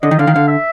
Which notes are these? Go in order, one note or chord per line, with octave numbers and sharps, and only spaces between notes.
D3 D#5
D#3
D3 F5
D#3
D3 F5
E5